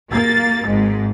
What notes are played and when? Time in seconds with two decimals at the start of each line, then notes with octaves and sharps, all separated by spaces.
0.11 A#3 A6
0.65 G#1 G#2